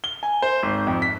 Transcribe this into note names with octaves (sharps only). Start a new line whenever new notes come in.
G7
G#5
C5
G#1
F2
B6